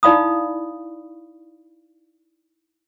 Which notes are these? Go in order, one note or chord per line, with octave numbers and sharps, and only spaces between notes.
D#4 E4 D5 F5 B5 D#6